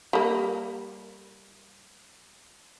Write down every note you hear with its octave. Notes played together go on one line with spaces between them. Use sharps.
G3 A#3